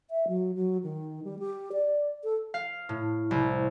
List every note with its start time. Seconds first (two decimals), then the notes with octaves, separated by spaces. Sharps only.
0.10 E5
0.28 F#3
0.55 F#3
0.83 D#3
1.24 G3
1.39 G4
1.72 D5
2.24 A4
2.54 F5
2.89 A2
3.31 C2